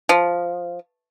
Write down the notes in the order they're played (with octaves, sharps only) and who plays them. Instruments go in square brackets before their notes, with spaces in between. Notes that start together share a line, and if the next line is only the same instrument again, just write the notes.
[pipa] F3